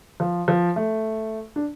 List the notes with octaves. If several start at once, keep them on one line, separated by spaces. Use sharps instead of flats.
F3
F3
A3
D4